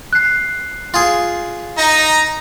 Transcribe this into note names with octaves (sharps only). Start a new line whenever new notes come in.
F#6 C7
F4 G#4
D#4 A#5